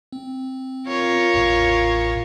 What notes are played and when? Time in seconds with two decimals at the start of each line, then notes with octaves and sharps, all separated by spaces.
0.12 C4
0.88 F4 A#4 C#5
1.34 A1 E2 A2